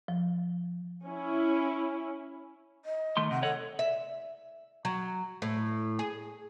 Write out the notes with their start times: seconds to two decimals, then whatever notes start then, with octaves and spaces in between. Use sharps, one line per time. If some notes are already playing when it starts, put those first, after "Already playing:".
0.08 F3
1.04 C#4 E4
2.85 D#5
3.17 D#3 A3 C6
3.31 C3 F#5
3.43 A4 C#5 D#5 F#5
3.79 E5
4.85 F#3
5.42 A2
5.99 G#4